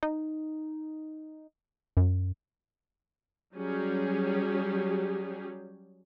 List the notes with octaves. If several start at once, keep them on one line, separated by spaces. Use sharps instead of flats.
D#4
F#2
F#3 G3 C#4 G4 G#4